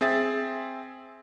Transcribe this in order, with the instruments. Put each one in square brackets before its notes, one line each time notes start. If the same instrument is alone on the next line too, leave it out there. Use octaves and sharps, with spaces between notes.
[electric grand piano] C4 G#4 E5 A6